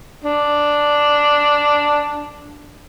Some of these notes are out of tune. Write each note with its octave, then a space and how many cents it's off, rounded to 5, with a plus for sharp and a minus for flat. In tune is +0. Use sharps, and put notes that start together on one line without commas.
D4 +0